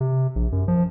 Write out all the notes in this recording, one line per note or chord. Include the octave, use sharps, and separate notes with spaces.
C3
A#1
F#2
F3